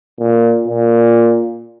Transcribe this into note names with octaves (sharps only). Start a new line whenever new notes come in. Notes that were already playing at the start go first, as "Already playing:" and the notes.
A#2
A#2